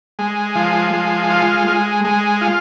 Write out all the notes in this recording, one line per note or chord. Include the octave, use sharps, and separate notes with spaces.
G#3
F3
G#3
F4
G#3
G#3
F4